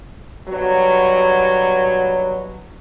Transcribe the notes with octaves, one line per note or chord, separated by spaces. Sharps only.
G2 B2 F#3